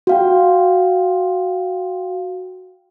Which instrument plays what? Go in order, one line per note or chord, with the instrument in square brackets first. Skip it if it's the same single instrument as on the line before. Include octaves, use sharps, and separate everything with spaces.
[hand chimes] F#4 F5 G5